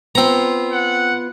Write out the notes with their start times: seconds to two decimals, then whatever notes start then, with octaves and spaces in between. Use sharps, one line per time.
0.15 B3 C4 F4 A#5
0.72 F#5